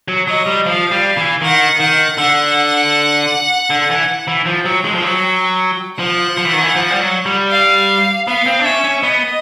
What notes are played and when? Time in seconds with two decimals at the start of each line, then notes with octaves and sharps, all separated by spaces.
0.08 F#3
0.28 F#3 D#5
0.46 G3
0.66 F3 F5
0.91 G3
1.17 E3
1.41 D#3 F#5
1.80 D#3 F#5
2.17 D3 F#5
3.70 D3
3.90 E3
4.27 E3
4.46 F3 G5
4.65 F#3
4.85 G#3
4.95 F3
5.03 F#3
5.98 F3 F#5
6.37 F3
6.45 E3
6.53 D#3
6.61 E3
6.75 F3
6.90 G3
7.00 F#3
7.26 G3
7.51 F5
8.27 B3 F5
8.46 C4
8.59 D4
8.65 C#4 E5
8.84 C#4
9.03 B3 D#5